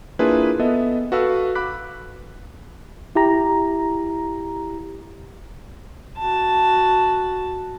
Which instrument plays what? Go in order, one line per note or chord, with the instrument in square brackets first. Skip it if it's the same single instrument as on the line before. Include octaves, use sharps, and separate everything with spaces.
[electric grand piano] A#3 D4 E4 F4 G#4 B4
B3 A4 D#5 E5
F#4 A4 B4 F5 E6
B5 D6 F#6 B6
[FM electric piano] E4 G4 A#5
[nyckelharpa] F#4 A5